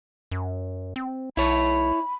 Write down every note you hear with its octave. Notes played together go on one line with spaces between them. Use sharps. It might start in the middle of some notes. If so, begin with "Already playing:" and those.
F#2
C4
B1 E4 C#5 B5